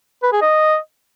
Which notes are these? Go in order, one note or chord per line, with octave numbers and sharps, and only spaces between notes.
B4
G#4
D#5